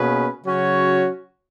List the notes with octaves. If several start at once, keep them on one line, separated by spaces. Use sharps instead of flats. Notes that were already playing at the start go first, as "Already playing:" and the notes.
Already playing: B2 A#3 C#4 G#4 B4
C#3 F#3 C#4 F#4 C#5